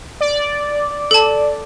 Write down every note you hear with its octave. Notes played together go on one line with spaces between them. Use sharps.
D5
A4 A5